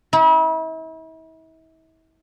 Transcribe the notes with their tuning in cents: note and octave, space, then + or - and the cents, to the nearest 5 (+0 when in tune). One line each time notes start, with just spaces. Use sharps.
E4 -40